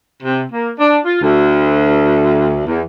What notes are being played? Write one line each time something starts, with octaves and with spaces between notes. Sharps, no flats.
C3
A#3
D4
F4
D2
E2